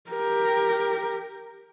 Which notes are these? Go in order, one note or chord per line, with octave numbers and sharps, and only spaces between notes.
G4 A#4